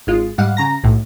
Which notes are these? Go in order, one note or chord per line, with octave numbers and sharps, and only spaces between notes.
G#1 G#3 F4
G#2 G3 F5 F#5
C#3 A#5 A#6
B1 A2